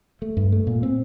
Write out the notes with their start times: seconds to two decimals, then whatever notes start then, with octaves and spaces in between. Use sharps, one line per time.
0.22 A3
0.37 G2
0.52 A3
0.67 A#2
0.83 C4